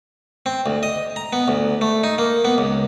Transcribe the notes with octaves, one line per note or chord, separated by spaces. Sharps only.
C4
D2
D#5
A#5
B3
D2
A3
D#4
A#3
B3
C#2